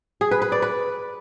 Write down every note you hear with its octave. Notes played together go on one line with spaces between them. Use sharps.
G#4
B4
B4
D5
B4